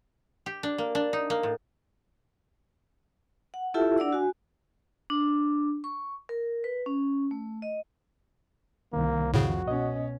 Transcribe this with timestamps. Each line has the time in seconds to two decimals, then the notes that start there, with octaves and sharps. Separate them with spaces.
0.46 G4
0.63 D4
0.78 A#3
0.95 D4
1.13 D#4
1.30 A#3
1.43 A2
3.54 F#5
3.74 E4 F4 G4 A4 E5 A5
3.98 D4 D5 F#5 E6
4.12 F#4 G#5
5.10 D4
5.84 C#6
6.29 A#4
6.64 B4
6.86 C#4
7.31 A3
7.62 D#5
8.93 C2 D#3 A#3
9.34 F2 A2 C#3 F#4
9.68 B2 C#4 D#5